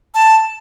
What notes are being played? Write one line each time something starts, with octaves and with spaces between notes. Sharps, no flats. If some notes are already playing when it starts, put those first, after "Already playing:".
A5